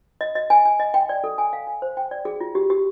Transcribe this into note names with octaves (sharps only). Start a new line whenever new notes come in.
D#5
D#5
G#5
G#5
D#5
G5
D5
A4
G#5
F5
G#5
C5
G5
D5
G#4
F4
G4
G4